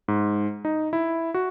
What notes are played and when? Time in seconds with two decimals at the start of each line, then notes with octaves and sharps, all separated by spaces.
0.08 G#2
0.65 D#4
0.93 E4
1.34 F#4